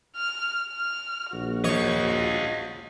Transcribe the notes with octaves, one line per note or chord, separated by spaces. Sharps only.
F6
F6
A#1 F#4
F4 C#5 D#5